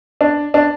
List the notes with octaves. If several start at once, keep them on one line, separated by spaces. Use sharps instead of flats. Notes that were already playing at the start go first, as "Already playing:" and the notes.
D4
D4